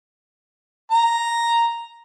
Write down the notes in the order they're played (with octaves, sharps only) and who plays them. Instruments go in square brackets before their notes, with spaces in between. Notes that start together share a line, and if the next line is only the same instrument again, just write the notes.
[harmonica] A#5